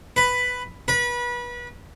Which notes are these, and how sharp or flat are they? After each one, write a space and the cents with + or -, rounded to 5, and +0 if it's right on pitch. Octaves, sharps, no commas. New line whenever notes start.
B4 +5
B4 -30